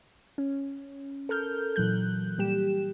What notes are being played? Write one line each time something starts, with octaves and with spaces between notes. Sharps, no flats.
C#4
A4 A#4 F6 G6
A#2 E3 F#3 F#6 G6
A#2 G3 G4 E7